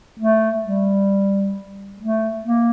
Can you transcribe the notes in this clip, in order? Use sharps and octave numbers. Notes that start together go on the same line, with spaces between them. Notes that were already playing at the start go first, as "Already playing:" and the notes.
A3
G3
A3
A#3